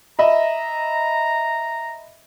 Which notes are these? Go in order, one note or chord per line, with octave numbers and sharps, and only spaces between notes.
D#5 E5 A#5 B5